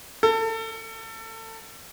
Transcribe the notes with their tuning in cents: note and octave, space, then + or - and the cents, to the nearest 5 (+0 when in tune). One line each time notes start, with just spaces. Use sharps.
A4 +30